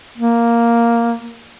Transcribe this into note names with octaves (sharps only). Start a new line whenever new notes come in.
A#3